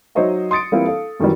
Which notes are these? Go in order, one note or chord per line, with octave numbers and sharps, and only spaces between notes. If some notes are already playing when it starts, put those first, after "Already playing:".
F#3 D#4 C5 C#5 D#5 E5
C6 D#6 A6 C#7 D7
E3 G3 A#3 C4 E4 F4
A4 F5
F#2 D#3 E3 F#3 G3